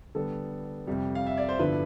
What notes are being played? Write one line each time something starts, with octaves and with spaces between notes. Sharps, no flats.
D3 G3 B3 A4
F2 C3 G3
F5
E5
D5
C5
G2 D3 F3 B3 E4 B4